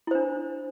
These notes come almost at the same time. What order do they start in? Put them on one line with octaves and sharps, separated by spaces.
E4 C5 D4